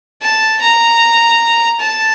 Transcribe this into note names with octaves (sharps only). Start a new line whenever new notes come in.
A5
A#5
A5